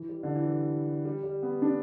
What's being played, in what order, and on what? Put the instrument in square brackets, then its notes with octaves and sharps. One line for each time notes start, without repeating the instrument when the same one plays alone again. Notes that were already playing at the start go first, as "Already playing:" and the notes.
Already playing: [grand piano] E3
G3
D3
E3
G3
G3
G3
B3
D4